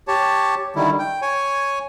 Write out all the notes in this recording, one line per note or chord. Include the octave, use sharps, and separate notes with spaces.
G4 C#5 A5
D3 D#3 G3 E4
G5
C#5 G#5